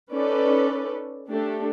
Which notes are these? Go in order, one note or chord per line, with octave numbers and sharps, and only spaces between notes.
C#4 D#4 A4 B4 D5
A3 D4 G4 A4